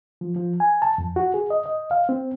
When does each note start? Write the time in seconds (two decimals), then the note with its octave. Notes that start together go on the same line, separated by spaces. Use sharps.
0.21 F3
0.36 F3
0.60 G#5
0.82 A5
0.98 F2
1.16 F#4
1.34 G#4
1.50 D#5
1.66 D#5
1.91 F5
2.09 C4